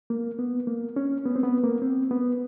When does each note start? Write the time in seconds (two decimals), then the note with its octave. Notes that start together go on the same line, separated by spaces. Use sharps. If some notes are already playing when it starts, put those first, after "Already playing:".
0.10 A#3
0.39 B3
0.67 A#3
0.96 C#4
1.25 B3
1.36 C4
1.43 B3
1.63 A#3
1.82 C4
2.11 B3